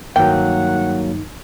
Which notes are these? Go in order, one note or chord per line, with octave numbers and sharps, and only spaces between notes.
G2 D#3 F#3 A#3 D#4 F#5 G5